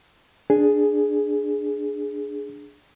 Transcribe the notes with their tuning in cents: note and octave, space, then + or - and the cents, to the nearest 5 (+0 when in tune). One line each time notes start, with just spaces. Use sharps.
D4 +0 G#4 +0